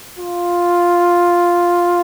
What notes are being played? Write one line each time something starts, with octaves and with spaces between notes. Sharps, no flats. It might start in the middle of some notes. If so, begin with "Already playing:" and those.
F4